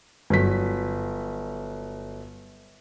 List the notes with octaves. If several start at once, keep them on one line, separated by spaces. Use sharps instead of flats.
G1 F#3 B6